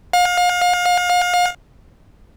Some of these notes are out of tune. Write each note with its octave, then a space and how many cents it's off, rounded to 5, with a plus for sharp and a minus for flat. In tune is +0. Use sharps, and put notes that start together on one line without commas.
F5 +35